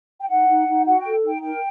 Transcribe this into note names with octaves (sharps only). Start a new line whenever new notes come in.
G5
D#4 F#5
D#4
D#4
F#4 F#5
A4 G5
D#4 G5
A#4 G5